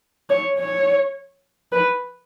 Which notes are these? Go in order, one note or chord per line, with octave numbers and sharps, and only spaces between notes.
C#5
C#5
B4